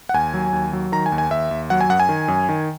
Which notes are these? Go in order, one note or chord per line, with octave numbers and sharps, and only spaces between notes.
F#5
D#2 G#5
F#3
D#2
F#3
D#3 A#5
G#5
D#2
G#5
D#2 E5
D#2
F#3 F#5
G#5
F#2 F#5
G#5
D#3
F#2
D#3